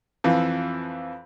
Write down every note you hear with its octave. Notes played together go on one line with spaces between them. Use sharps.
F2 E3 F3